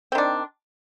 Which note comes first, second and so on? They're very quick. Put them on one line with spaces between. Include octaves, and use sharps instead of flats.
C4 D#3 D4